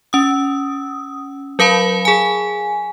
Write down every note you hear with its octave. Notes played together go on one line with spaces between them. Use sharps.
C#4 D#6
F#3 A#4 F5 A5 B5
G#4 G#5